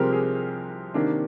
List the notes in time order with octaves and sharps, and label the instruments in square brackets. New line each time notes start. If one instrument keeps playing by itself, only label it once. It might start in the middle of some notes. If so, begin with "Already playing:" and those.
Already playing: [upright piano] C2 C3 F3 G#3 C4 G4 A#4
G#4
C3 D#3 A#3 D4